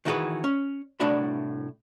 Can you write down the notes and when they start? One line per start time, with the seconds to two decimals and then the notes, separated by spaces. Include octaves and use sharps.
0.05 D#3 E3 D#4 F#4 G#4 B4
0.44 C#4
1.00 C2 A2 D4 F#4 E5 B5